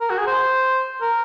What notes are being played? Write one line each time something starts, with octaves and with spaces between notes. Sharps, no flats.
A#4
F#4
G#4
C5
A#4